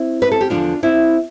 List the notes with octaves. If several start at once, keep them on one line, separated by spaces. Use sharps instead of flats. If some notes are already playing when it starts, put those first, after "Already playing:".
Already playing: C4 E4
B4
A4
G4
E2 D3 F3 D4 F4
C4 E4